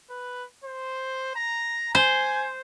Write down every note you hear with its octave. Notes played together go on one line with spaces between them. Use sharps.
B4
C5
A#5
C5 G#5